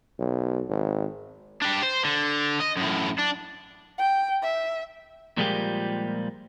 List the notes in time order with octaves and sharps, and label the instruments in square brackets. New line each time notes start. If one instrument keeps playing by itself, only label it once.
[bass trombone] B1
G#1
[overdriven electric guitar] D4 G4
C5
D3
D#5
F#2 A2
D4
[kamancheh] G5
E5
[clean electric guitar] A#2 F3 G3 G#3 A#3 G4